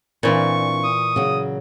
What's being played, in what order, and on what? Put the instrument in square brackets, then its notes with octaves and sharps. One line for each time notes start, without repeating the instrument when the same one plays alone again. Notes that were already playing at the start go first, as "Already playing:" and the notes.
[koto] A#2 E3 [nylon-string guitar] C4 D4 F4 [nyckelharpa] C#6
[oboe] D#6
[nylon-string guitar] C#3 F#3